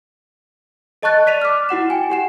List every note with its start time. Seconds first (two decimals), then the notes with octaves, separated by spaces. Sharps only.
1.02 A4 D#5 A5 C#6 F#6 A6
1.26 D5 B6 D#7 F7
1.42 D6 F6
1.69 E4 F#4 F#5 E7
1.90 G5 G#5
2.10 G4 F#5 E7